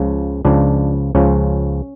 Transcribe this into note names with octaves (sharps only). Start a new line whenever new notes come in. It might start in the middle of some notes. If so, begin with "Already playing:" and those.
Already playing: C#2 C#3 F3
C#2 C#3 F3 D4
C#2 C#3 F3 C#4